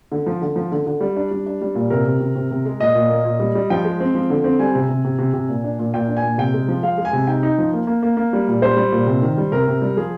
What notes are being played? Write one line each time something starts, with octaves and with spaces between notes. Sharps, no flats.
D3
F3
D3
F3
D3
D3
G3
D4
G3
D4
G3
A#2
C3 A#4
C3
C3
C3
C3
G#3
A#2 D#5
A#2
A#3
A#2
G3
G3
F3 G5
G#3
C4
F3
D3
C4
G3 G#5
C3
C3
C3
C3
C3
A#2
D4
A#2
A#2 G5
D4
G#5
A#2
C3 G5
G#3
F3
G#3 F5
G#3
G#5
C3
D#4 G5
D#4
F3
A#3
A#3
A#3
A#3
G3
A#2
G3 C5
G3
A#2
C3
D#3
G3
C3 A#4
C3
G3
F3 G#4